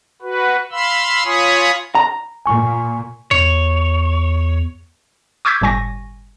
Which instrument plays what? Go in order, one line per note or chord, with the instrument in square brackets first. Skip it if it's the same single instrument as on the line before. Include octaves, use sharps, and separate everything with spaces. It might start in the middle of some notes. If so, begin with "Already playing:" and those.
[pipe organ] F#4 B4
F5 B5 C6 E6
F4 C#5 G#5 B5 C#6 D#6
[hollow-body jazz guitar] A#5
[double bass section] A#2 [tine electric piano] G#5 C#6
[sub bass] E2 [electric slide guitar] C#5
[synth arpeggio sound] C#6 D6 E6 G6 G#6 B6
G1 A2 G3 G#5 C#6 A#6